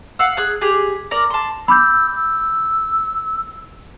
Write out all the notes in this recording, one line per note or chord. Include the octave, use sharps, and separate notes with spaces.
F5 F#5 E6
G#4 F#6
G4 G#4
A#4 D5
A5 C6
B5 D6 E6 G6
E6